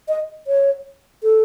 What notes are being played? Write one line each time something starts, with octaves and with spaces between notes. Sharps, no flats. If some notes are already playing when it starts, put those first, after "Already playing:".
D#5
C#5
A4